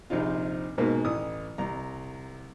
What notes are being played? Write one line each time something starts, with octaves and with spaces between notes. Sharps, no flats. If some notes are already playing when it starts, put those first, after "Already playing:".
A#1 C3 C4 D#4 F4
G#2 B2 G#3 A#3
A1 E3 D#6
C2 A#5